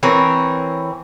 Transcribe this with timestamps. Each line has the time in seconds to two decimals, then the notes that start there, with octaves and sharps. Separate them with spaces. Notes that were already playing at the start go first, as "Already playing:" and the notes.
0.03 E3 C4 A#4 C#5